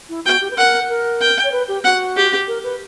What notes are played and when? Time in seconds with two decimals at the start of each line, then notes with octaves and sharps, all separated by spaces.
0.09 E4
0.26 F#4 G5
0.41 G4
0.51 B4
0.57 A#4 F#5
0.89 A#4
1.20 G5
1.44 C#5
1.52 B4
1.68 G4
1.84 F#4 F#5
2.16 G4
2.48 A#4
2.63 B4